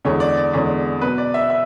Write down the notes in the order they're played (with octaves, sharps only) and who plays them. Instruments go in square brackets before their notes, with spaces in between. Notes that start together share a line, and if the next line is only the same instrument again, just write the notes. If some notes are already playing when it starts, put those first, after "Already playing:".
[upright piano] E2 D3 G#3 C#5
D5
D5
E2 D3 G#3 C#5
B2 F#3 B4
D5
E5
E5